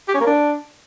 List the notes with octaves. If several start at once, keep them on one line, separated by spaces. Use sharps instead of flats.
G4
C#4
A#3
D4